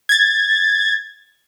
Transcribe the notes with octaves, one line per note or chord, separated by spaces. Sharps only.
G#6 A6